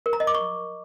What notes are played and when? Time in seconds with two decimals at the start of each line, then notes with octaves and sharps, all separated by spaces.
0.06 A#4
0.13 A#5
0.20 D#5
0.27 D6
0.34 C#6